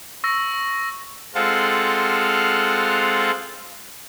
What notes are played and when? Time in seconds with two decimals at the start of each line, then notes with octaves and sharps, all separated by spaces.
0.24 C#6 E6 A#6
1.34 G#3 C4 F4 A4 F5 F#5